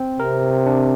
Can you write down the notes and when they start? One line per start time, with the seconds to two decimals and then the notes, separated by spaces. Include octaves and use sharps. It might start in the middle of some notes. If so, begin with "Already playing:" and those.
Already playing: C4
0.19 C3 A#4
0.66 D4